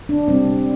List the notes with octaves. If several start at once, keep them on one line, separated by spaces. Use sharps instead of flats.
D4
C3 G3 C4